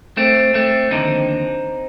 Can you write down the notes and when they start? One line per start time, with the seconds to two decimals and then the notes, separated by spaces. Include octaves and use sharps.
0.17 A3 C4
0.54 A3 C4
0.91 D#2 D3 F3 C4 D#4